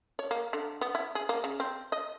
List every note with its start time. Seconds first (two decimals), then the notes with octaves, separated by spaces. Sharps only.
0.19 C#5
0.31 A#3
0.53 D3
0.81 B3
0.95 E4
1.15 G#4
1.29 A#3
1.44 C#3
1.60 C4
1.92 D#5